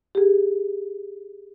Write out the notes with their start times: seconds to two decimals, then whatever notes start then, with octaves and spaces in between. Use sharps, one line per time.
0.15 G4 G#4